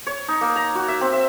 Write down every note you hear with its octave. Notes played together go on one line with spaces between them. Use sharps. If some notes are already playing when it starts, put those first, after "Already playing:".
C#5
D#4
A#3
A#5
F#4
E5
C4
E5